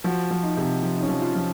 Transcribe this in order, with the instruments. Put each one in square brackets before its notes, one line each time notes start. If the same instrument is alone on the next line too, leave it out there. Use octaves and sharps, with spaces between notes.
[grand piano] F3 F#4
F3
D#4
C3
F3
D#4
C#4
F3
F4
F3